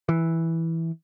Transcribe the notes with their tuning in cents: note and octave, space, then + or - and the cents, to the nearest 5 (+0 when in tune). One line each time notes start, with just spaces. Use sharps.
E3 -5